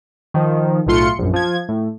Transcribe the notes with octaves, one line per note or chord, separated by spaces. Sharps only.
D#3 F3
B1 A2 A3 F4 C6 C#7
A#1 F#2
F3 G#6
A2